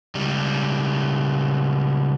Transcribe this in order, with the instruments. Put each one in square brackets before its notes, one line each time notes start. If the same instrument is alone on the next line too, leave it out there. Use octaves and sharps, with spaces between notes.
[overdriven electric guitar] C#2 G3